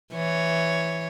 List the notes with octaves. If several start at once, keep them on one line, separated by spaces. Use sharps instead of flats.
E3 C#5